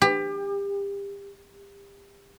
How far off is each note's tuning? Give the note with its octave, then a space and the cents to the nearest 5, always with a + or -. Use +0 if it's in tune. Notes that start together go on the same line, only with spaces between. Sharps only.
G4 +30